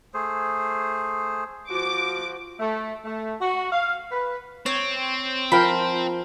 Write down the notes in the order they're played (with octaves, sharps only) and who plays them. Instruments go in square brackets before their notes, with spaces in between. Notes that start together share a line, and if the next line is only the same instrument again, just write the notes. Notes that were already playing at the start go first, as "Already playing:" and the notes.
[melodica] A3 G#4 C5
[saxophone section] F3 F#4 [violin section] D6
[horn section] A3
A3
F#4
F5
B4
[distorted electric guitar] C4 [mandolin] C#5
[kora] F3 A#4 G5 [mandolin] B5